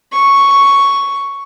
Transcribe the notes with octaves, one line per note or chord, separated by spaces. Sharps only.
C#6